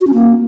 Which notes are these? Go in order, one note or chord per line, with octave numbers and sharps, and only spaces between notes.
F#4
C#4
A#3